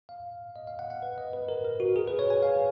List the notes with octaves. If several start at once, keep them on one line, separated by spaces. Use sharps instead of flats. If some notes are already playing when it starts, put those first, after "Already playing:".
F5
D#5
F5
F#5
F#5
B4
D#5
B4
A#4
A#4
F#4
G#4
B4
C#5
G#5
F5